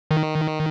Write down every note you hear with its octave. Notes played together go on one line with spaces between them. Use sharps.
D#3